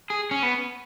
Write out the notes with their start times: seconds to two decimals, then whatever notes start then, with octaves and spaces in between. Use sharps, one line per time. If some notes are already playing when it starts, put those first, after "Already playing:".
0.10 G#4
0.31 C#4
0.43 B3